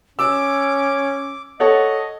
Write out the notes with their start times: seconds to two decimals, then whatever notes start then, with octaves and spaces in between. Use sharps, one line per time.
0.19 C#4 D6 E6
1.60 A4 C#5 D#5 F#5